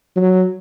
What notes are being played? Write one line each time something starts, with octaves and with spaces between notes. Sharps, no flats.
F#3